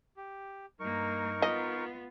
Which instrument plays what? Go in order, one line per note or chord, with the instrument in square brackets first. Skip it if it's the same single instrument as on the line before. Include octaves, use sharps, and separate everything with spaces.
[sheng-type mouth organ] G4
[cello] G2 A#3 [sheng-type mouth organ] D#4 A#4 C#6
[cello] B3 F4 [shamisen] D#5